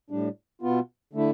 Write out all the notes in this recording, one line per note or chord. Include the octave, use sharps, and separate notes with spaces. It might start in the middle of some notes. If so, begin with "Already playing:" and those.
A2 G3 D4
B2 B3 F4
D3 A3 E4